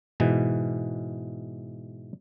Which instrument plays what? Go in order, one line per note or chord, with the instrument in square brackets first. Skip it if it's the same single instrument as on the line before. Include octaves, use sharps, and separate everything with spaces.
[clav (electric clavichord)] G#2 B2 E3